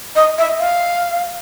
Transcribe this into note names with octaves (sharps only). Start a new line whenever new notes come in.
D#5
E5
F5